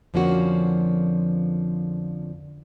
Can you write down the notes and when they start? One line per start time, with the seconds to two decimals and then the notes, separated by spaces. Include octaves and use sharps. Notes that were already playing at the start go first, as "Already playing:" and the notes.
0.14 F2 D3 F3 A#3 C#4 F#4